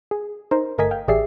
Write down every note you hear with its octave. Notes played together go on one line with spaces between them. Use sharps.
G#4
D#4 A#4 C5
G1 A3 A#4 D#5 G#5 B6
F5 G5
A1 G4 G#4 D5 E5 C7